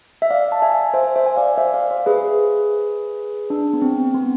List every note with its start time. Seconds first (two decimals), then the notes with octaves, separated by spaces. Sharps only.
0.22 E5
0.31 D5 F5
0.52 A5
0.62 E5 G#5
0.94 C5 E5
1.16 C5 E5
1.26 G#5
1.36 D5 F5
1.58 C5 E5
1.74 D5 F5
1.90 C5 E5
2.06 G#4 B4
3.50 D4
3.73 B3
3.82 C4
4.14 B3